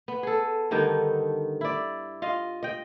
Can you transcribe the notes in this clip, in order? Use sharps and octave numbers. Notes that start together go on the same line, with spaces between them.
B3
G#4 A4
G2 D3 D#3 D#4
E4 D5
F4 D#5 F5
D#5 G5